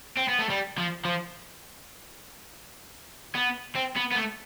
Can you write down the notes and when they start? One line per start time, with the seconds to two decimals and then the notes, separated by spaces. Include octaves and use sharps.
0.17 C4
0.29 B3
0.39 A3
0.50 G3
0.78 F3
1.05 F3
3.35 B3
3.76 C4
3.97 B3
4.12 B3
4.16 A3